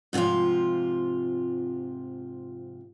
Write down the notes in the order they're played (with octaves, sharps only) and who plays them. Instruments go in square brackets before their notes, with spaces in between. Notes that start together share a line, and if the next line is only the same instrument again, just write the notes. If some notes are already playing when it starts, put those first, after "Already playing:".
[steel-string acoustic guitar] G#2 C3 D#3 F3 F4